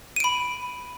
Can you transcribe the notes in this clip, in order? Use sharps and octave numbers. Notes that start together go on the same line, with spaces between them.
B5 D7 D#7